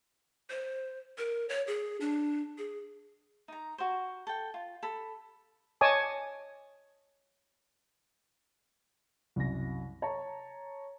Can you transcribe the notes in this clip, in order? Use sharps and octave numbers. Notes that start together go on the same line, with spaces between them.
C5
A#4
C#5
G#4
D4
G#4
D#4 A#5
F#4 C5
A4 G5
F4
A4 B5
C#5 D#5 G#5 A5 D6 D#6
C2 F#2 C3 A#6
C#5 A5 A#5